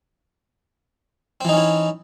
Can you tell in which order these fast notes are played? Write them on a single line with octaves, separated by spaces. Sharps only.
C4 E3 D#4 C#4 E4